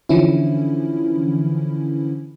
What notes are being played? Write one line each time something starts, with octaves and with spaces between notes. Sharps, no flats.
D3 E3 F3 C#4 E4